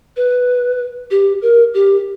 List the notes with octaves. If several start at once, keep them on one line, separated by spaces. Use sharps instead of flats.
B4
G4
A#4
G4